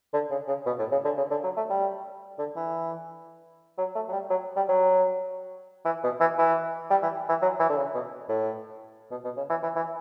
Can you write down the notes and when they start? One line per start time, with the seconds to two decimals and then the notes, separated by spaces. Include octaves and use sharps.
0.13 D3
0.31 C#3
0.48 C#3
0.66 B2
0.79 A2
0.91 C#3
1.05 D3
1.17 C#3
1.30 D3
1.43 F#3
1.57 A3
1.70 G3
2.39 D3
2.56 E3
3.78 F#3
3.95 A3
4.08 F#3
4.12 G3
4.30 F#3
4.56 G3
4.69 F#3
5.85 E3
6.04 B2
6.20 E3
6.38 E3
6.90 G3
7.02 E3
7.29 E3
7.42 F#3
7.60 E3
7.70 D3
7.76 C#3
7.94 B2
8.29 A2
9.11 B2
9.24 B2
9.37 C#3
9.50 E3
9.63 E3
9.76 E3